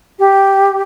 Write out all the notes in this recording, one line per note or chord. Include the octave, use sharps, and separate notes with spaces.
G4